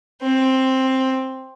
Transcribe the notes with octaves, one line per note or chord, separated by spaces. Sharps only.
C4